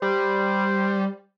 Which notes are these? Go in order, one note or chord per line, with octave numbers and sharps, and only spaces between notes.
G3 C5